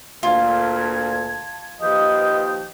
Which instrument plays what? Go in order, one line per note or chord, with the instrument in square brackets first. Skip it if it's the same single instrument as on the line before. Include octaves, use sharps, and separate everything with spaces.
[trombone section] D2 A#2 [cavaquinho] F4 [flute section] A5 G#6
[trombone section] D#2 F3 G4 [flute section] B4 D#6 G6 [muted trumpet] D#5